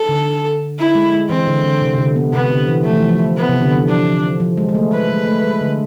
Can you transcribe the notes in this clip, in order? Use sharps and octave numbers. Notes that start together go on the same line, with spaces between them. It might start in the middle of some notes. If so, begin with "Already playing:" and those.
Already playing: A4
D3
E4
G#3
G#3
E3 C4
D3
D3
C3
C3
D3
B3
C3 B3
D3
E3
F3 A3
E3
F3
B3
C3
D3
E3
F3 D4
F3
F3
G#3
G#3
A3
G#3 B4
G#3
A3
G#3
D3